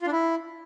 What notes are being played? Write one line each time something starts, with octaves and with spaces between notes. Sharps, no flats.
F4
D4
E4